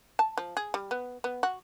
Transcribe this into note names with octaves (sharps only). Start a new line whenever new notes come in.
A5
F3
G#4
G3
B3
B3
F#4